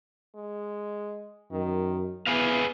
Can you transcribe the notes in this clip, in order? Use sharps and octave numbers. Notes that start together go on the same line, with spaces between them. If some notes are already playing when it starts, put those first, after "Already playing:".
G#3
F#2 D#3
E3 B3 G#4 B4 F5